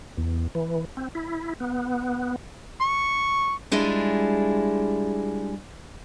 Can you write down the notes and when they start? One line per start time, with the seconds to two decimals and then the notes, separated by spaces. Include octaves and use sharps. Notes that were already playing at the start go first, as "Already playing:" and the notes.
0.17 E2
0.55 E3
0.97 C4
1.15 E4
1.60 B3
2.81 C#6
3.72 G3 G#3 D4 E4 F4 G#4